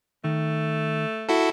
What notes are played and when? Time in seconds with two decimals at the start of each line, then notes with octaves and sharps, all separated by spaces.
0.24 D#3 A3
1.29 E4 F#4 A4